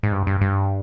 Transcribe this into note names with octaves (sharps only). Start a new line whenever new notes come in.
G#2
G2
G2
G2